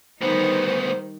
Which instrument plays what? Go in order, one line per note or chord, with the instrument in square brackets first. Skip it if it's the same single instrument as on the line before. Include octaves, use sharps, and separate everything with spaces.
[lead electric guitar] D2 B3 [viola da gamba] D#3 G3 D#4 [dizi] C5